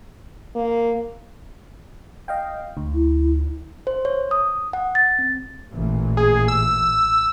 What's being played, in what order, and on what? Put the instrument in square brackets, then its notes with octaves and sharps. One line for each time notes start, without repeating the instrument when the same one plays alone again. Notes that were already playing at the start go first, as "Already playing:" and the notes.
[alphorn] A#3
[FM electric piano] D#5 F5 G5
D2
[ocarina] E4
[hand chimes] C5
C#5
D#6
F#5
A6
C4
[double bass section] A1 A#2 E3
[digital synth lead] G#4
E6